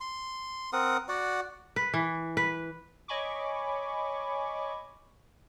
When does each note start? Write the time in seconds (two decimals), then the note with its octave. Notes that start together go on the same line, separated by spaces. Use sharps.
0.01 C6
0.73 C4 A#4 F#5 D#6
1.09 F#4 D5 F#5
1.76 B4
1.94 E3
2.37 B4
3.08 C#5 D#5 G#5 B5 C#6 D6